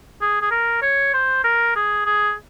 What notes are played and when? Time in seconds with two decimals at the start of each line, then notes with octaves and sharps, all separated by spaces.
0.21 G#4
0.41 G#4
0.51 A#4
0.82 C#5
1.14 C5
1.44 A#4
1.76 G#4
2.05 G#4